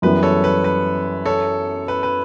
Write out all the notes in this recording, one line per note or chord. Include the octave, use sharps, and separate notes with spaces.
F#2 E3 G3 B3 B4
A4 C#5
B4
B4
A4 C#5
B4
B4